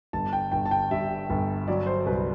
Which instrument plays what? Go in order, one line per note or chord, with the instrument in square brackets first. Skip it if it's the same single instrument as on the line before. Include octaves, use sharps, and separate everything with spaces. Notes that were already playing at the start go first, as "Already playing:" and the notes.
[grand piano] G1 A5
G5
G1 G5
A5
G5
G2 E5
G1
F#3 D5
C5
C2 B4